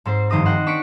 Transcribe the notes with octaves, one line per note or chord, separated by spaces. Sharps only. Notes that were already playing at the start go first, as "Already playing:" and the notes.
G#2 C4 C5
F1 G2 D#3 C5 D#6 A#6
C5 D#5 F#5 G5
D4 C#6 B6 C#7 D7